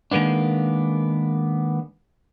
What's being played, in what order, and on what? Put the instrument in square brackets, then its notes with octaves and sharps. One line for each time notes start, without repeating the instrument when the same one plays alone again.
[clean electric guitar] D#3 G#3 A#3 B3 D4